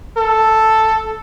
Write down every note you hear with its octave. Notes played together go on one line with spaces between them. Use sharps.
A4